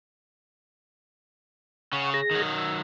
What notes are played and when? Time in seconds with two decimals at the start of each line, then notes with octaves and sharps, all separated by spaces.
1.93 C#3 C#4 F#5 C#6
2.14 G#4 A#6
2.31 D#3 F#3
2.58 E6